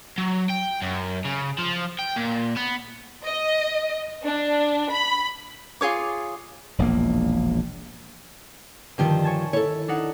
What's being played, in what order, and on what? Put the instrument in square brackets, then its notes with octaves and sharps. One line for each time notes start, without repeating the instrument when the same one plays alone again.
[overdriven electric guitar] F#3
G5
F#2
C#3
F3
G5
A#2
B3
[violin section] D#5
D4
B5
[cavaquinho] F4 G#4 C#5 D6
[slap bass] E1 A#1 E2 A#3
[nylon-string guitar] G2 F3 G4 [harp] D3 D#3
[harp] C#5 G#5 A5
[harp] E4 [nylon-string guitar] A4 C#5
[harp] D4 D#4 F#5